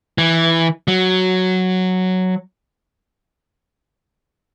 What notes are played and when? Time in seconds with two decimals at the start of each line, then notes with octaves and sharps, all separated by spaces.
0.18 E3
0.88 F#3